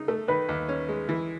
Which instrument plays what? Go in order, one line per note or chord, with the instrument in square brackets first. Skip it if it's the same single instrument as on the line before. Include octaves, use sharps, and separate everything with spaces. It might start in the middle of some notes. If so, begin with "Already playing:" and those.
Already playing: [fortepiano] C#3 D#4
[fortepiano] A3 [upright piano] A4
[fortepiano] D#3 [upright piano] B4
[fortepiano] D#2
C#4
G#3
E3